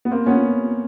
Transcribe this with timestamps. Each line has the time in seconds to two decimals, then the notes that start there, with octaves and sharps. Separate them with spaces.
0.05 B3
0.11 A#3 C4
0.26 B3 C#4